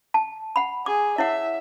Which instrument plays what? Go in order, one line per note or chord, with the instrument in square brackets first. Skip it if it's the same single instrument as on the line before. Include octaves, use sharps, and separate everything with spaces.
[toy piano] A5
F#5 B5
[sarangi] G#4 [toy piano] D6
[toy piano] E4 C#5 F#5 [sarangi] E5